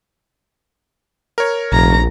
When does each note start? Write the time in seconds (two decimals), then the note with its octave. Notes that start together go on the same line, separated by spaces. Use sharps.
1.38 A#4 C#5
1.72 F1 A#1 A#5